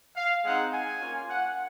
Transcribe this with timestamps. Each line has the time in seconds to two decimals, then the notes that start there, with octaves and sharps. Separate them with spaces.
0.16 F5
0.44 G#3 C4 D#4 F#5
0.72 G#5
1.01 A#3 C#4 F4
1.29 F#5